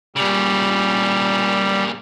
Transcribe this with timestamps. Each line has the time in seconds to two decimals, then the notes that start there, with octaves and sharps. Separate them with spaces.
0.16 A#2 C#3 G3